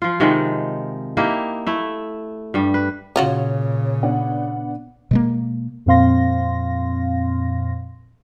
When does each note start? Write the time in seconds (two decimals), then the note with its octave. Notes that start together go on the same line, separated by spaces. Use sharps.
0.02 F3 F4
0.20 C3 D#3 F3 G#3
1.17 A#3 D#4 E4 G4
1.67 A3 E4
2.54 G2 G3
2.74 B4
3.16 A#2 C#3 C#4 F4 F#4 C#5
4.03 B3 D4 F#5
5.11 B2 G#3 A#3
5.86 F2 A#2 C4 F5 C6 A#6